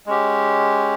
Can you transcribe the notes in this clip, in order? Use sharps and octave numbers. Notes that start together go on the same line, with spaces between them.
G#3 C#4 G4